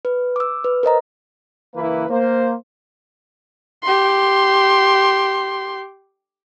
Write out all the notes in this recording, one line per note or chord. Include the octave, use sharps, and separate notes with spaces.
B4
D6 E6
B4
A#4 C5 D#5 A#5
F#1 E3 A#3 E4 B4
A#3 C5
G4 C6